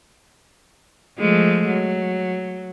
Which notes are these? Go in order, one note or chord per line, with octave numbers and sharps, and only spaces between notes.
F3 G#3 A3
F#3